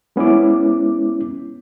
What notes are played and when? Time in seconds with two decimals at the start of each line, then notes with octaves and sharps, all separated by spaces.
0.16 G#3 B3 C#4 E4 D6